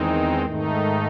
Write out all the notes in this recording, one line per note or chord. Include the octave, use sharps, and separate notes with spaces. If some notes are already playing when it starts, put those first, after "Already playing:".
Already playing: E2 D#3 G#3 C4 D#4
G#2 D#3 A3 D#4